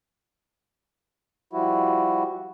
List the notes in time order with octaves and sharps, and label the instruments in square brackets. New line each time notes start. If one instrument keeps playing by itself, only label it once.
[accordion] F3 G3 E4 F#4